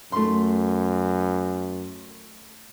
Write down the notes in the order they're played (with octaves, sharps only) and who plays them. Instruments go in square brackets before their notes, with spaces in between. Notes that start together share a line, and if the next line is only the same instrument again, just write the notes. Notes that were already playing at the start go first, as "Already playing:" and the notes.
[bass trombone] F#2 [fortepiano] A3 C6